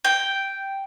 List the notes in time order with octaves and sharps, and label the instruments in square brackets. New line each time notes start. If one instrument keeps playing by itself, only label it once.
[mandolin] G5